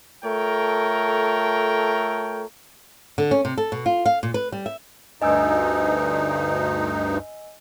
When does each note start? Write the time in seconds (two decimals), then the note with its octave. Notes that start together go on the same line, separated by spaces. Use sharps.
0.23 A3 F4 A4 A#4 C#5 G5
3.18 D3
3.31 C#4
3.45 C3
3.58 A4
3.72 B2
3.86 F4
4.06 F5
4.23 A#2
4.34 B4
4.52 G3
4.66 E5
5.22 D2 G2 D#4 D#5 G#5 E6